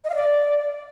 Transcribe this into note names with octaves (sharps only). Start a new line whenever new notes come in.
D#5
F5
D5